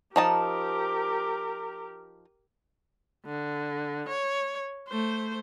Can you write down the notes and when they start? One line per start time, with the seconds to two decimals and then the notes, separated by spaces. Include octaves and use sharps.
0.16 F3 D#4 G4 A#4 A5
3.25 D3
4.08 C#5
4.88 A3 C5